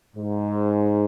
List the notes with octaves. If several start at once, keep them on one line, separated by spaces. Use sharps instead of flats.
G#2